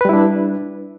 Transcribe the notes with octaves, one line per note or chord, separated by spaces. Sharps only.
G3 D4 E4 B4